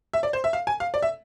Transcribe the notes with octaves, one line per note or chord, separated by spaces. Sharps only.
E5
D5
C5
E5
F5
G#5
F5
D5
E5